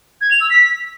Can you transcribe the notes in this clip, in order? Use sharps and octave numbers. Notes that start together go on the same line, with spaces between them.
G#6
F7
E6
B6